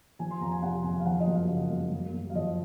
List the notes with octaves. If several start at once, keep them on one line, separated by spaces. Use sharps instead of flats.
F3 G#5
C6
F2 A#5
G#5
C3 F#5
F2 G#5
F5
F3 F#5
D#5
F#2
F5
C#3
F#2
F#2
F#2
F5
F3 D#5